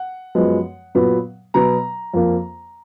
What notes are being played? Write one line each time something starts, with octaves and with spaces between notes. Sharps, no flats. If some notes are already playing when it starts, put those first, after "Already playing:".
Already playing: F#5
F#2 F3 G#3 B3
A#2 F#3 B3
B2 F#3 B3 A#5
F2 F3 A#3